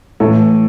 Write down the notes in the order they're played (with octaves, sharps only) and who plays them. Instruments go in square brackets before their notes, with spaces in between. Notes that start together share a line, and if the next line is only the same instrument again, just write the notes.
[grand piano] A2 E3 A4